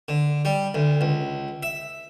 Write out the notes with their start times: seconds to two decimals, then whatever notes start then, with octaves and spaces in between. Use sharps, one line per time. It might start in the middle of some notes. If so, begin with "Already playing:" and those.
0.08 D3
0.45 G3
0.74 D2
1.01 C#2
1.63 E5